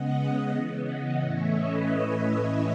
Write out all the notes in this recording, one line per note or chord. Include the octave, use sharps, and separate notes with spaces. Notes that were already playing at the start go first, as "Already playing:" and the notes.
Already playing: C#3 G#3 B3 D#5 F#5
C#3 E3 B3
D#5 F#5
A2 E3 A3 C#4 C#5 E5
B4 D#5